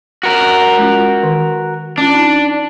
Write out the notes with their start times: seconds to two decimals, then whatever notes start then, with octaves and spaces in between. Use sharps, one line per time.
0.23 F#4 A#4
0.78 G#3 C#4 F4
1.23 D#3
1.98 C#4 D4 F4
2.14 D#4